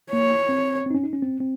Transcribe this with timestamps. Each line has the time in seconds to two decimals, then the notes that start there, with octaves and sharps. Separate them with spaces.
0.12 A#3 C#5
0.49 C4
0.86 C4 D#4
0.95 C#4
1.04 D#4
1.13 C#4
1.22 C4
1.40 C4